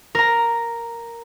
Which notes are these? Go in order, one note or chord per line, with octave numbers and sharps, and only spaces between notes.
A#4 A#5